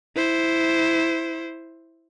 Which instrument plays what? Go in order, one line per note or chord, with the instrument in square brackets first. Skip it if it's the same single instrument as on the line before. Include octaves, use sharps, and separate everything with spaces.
[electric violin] E4 C5